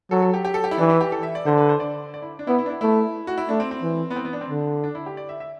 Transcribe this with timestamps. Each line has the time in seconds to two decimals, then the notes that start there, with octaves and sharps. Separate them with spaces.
0.11 F#3 A4
0.22 A4
0.34 G4
0.45 G4
0.54 A4
0.64 G4
0.71 E4
0.78 E3 D4
0.90 E4
1.01 G4
1.12 A4
1.23 E5
1.35 D5
1.46 D3 C5
1.58 B4
1.69 C5
1.80 D5
2.14 D5
2.22 E4
2.39 D4
2.47 B3 E4
2.59 E4
2.66 D4
2.70 E4
2.81 A3 E4
3.27 F#4
3.38 E4
3.49 A3 D4
3.60 C4
3.71 C4
3.82 E3
4.10 B3
4.16 C4
4.25 B3
4.33 D4
4.41 C4
4.50 D3 D4
4.84 D4
4.95 E4
5.06 G4
5.17 D5
5.29 E5
5.40 E5